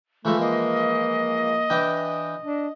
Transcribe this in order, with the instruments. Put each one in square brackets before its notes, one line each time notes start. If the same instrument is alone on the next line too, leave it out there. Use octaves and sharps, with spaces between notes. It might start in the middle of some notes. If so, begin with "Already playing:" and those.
[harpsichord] E3 F3 G#3 [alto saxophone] A3
[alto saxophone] A#3 [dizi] D#5
[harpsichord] E3 D4 G5
[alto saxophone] D4